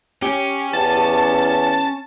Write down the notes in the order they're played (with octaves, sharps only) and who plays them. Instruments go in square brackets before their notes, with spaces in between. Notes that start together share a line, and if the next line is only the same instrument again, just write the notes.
[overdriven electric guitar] C#4 [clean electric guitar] G4
[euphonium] E2 [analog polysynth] A5